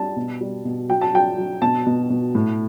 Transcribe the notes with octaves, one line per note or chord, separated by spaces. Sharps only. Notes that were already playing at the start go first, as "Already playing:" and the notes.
Already playing: G3 A5
B2
G3
B2
F#3 G5
A5
F#3 G5
F#3
B2 A5
B2
B2
A2